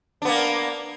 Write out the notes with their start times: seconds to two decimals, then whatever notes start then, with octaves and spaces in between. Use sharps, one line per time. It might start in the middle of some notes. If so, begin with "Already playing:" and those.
0.22 D4
0.25 B3
0.28 A#3